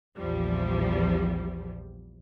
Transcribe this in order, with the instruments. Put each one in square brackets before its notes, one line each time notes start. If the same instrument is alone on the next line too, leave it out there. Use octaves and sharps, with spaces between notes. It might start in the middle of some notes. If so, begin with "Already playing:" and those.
[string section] A#1 E2 F3 G3